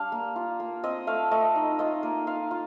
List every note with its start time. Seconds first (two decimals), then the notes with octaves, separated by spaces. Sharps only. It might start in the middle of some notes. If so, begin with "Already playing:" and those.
Already playing: G3 D4 F5
0.12 A#3
0.36 F4
0.60 A#3
0.83 C4 D#5
1.07 A3 F5
1.31 A3 D#5
1.56 D#4
1.79 F4 D#5
2.03 A#3
2.27 F4 F5
2.51 F4